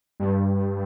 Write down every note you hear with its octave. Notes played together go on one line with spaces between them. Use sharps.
G2